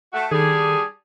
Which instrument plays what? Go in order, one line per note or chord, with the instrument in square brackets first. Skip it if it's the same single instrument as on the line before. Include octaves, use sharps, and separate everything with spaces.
[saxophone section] A3 F#4
[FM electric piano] D#3 A4 [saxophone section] G3 D4 G#4